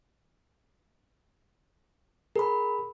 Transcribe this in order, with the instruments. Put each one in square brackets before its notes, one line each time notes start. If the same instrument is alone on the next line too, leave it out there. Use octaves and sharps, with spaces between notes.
[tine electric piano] G#4 [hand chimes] A#4 B5